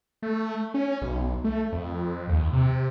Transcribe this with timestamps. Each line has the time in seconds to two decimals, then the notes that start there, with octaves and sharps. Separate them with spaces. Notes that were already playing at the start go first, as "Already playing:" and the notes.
0.22 A3
0.74 C#4
1.01 B1
1.44 A3
1.72 F2
2.29 D#2
2.53 C3